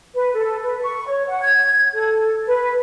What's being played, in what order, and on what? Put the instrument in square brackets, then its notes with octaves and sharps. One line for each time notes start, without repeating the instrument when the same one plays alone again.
[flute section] B4
A4
B4
C#6
C#5
F#5
G#6
A4
B4